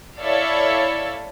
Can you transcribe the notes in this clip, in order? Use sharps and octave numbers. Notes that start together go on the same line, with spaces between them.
E4 A4 C#5 D5 E5 F5